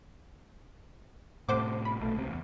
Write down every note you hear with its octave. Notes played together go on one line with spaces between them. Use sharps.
A2 C3 C5 F#5 D6
B5
B1 A3
C#2 C3
E2